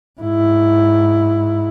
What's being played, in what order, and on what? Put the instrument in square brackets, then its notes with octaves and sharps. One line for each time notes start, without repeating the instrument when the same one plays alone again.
[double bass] G#2 E4